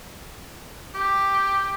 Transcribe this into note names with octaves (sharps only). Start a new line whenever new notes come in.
G4